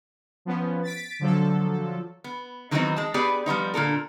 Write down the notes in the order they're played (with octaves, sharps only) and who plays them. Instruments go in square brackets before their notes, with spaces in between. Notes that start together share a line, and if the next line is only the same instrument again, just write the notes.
[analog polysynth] F3 B3 C#4
A6 B6 D7
D3 F3 F#3 A4
[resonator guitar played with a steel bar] B3
D#3 E3 F#3 B3 C4 D#4
G#3 A5
B3 G4 G#4 B4 D5
F3 G3 B3 D#4
A#2 D3 A4 A#4